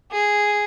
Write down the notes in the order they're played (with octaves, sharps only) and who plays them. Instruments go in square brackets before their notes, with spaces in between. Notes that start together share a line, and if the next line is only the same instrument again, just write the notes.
[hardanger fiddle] G#4